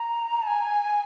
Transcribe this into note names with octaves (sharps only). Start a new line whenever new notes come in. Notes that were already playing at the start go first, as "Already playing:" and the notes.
Already playing: A#5
A5
G#5